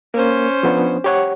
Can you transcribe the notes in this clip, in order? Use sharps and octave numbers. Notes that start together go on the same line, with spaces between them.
A#3 C#4 C5
F3 B3 D4
G4 C#5 F#5